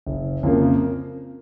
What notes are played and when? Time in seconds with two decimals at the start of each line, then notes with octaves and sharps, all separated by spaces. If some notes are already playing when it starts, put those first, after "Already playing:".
0.07 F#1
0.43 F2 C#3 F3 A#3